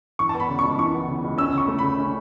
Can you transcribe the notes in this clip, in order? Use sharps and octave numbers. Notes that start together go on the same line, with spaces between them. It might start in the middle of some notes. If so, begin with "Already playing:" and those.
E3 C#6
A5
B3
B5
C#3
C#2 C#6
E3 C#6
B3
C#3
C#2
C#4 E6
C#3 C#6
A3
C#3 B5
C#4